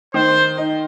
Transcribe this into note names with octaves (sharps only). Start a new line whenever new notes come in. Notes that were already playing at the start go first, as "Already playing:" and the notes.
D#3 C5
D#4